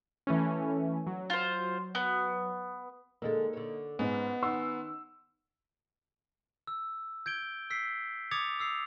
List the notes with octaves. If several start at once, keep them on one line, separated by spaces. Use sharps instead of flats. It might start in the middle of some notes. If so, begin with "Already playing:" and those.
E3 A3 C#4
F#3
F4 C5
B3
D3 G#3 A#3 D#4 A4
D3 C#5
G#2 B3 C#4 C#5 D#5
D#3 C#4 D#4 F#5 C6 E6
E6
G6 G#6 D7 G7
E6 B6 C7 D7
D6 D#6 G#6 A6 C#7 F7
D#6 E6 C7 F7